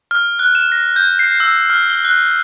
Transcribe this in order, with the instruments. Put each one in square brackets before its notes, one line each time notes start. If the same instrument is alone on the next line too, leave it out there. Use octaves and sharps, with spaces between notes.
[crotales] F6
F#6
E7
A#6
G6
C7
E6
F6
G7
F#6